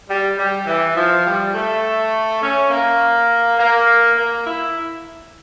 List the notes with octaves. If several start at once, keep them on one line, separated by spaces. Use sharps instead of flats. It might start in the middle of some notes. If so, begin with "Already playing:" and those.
G3
G3
E3
F3
G3
A3
C#4
A#3
A#3
A#3
E4